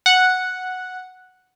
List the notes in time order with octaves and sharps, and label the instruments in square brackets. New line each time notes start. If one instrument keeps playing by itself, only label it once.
[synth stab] F#5